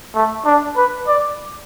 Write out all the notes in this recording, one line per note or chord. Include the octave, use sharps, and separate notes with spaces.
A3
D4
B4
D5